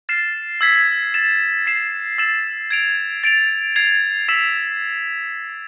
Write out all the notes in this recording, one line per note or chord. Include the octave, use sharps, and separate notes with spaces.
F6 A6 C7 E7
E6 G#6 B6
A6 E7
A6 C7 E7
E6 A6 E7
G#6 D7 F7
A6 D7 F7
G#6 C7 F7
E6 B6 E7